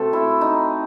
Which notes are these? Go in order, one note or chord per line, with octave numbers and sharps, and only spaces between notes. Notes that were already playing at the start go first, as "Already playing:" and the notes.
Already playing: C3 A3 C4 F#4 A4
E4
D#4